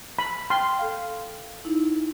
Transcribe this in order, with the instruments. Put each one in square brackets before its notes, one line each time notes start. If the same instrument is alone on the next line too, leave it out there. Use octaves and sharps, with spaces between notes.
[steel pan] B5
[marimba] G5 F6 [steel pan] C6
[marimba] A4 F5
D#4 E4